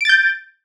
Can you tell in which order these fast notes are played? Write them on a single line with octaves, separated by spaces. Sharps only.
D7 A6 G6